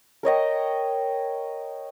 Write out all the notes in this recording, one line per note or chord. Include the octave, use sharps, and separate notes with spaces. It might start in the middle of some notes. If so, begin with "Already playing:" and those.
A#4 C#5 D#5 G5